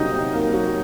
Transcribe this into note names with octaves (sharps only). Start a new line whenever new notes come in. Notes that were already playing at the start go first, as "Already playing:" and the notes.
Already playing: C3 F#3 A#3 D#4 D#5
C3
A#3
F#3